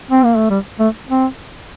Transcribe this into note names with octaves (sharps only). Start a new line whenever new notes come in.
C4
A#3
A3
G3
A3
C4